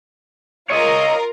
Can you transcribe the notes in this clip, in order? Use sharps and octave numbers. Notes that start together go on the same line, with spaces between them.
F4 A#4 C#5 D#5